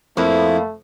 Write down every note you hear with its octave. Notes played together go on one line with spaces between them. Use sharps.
F2 F3 A3 A#3 E4 B4